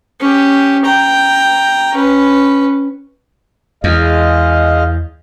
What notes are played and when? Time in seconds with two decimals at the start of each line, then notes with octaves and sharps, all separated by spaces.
0.20 C#4 G4
0.85 G5 A#5
1.95 C#4 B4
3.84 E2 G#3 D#5 F5